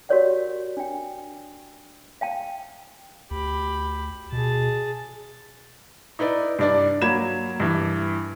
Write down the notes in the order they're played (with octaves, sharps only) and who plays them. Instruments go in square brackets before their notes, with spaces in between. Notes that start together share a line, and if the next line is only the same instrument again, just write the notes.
[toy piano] F#4 G4 A#4 C#5 D5 F#5
D4 G5
F5 G5 A5
[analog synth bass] D2 [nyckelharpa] G4 B5
[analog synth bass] B2 [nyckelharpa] G#4 A5
[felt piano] D#4 E4 B4 D5
G2 D4 D5
F#3 A#3 B5 G#6 E7
G2 E3